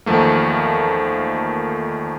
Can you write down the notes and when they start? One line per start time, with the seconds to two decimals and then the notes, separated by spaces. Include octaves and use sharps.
0.06 E2 D#3 F3 A3 A#3